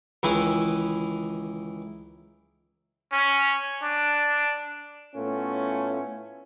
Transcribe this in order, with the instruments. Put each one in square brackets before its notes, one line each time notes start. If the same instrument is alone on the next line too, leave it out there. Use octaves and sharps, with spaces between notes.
[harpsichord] C#2 D#3 E3 E4 B4
[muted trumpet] C#4
D4
[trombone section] A2 A3 B3 C#4 F4